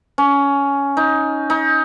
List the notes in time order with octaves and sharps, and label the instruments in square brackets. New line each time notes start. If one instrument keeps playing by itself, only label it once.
[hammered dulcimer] C#4
D#4
D#4